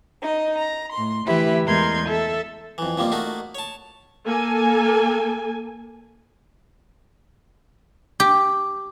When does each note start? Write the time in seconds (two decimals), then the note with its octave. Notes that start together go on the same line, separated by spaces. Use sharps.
0.22 D#4 D#5
0.57 A#5
0.92 A2 C6
1.26 D2 E3 E4 G4 B4 E5
1.64 E2 G#3 A#4 C6 G6 G#6
2.06 A4 E5
2.78 F2 E3
2.98 F2 F3 G3 A#3
3.12 A3 A#3 D#4 F#4
3.55 C#5 A5
4.26 A#3 A4 G#5
8.20 G4